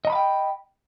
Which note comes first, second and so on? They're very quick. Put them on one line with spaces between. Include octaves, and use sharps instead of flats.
D#5 A#5 B5 F5 G5